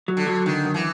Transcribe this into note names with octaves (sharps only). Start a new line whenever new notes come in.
F#3
D3
F#3
D3 D#3
F#2
E3